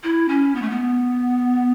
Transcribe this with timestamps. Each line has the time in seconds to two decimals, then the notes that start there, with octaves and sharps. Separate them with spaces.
0.03 E4
0.28 C#4
0.55 B3
0.62 A3
0.70 B3